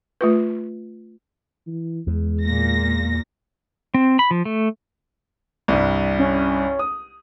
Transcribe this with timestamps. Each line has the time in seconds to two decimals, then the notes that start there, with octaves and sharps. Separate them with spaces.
0.21 A3 F4 B4
1.67 E3
2.07 E2 G#3
2.45 A#2 A#6
3.94 C4
4.19 B5
4.31 F3
4.45 A3
5.68 C2 G2
6.19 C#4
6.79 D#6